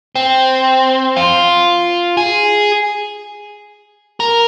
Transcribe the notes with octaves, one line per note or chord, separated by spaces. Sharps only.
C4
F4
G#4
A#4